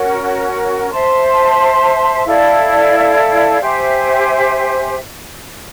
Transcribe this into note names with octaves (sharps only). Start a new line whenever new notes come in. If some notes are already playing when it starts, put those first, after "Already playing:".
Already playing: C#4 F#4 A#4
C5 E5 A5 C6
E4 A4 D5 F5
G4 C5 E5 G#5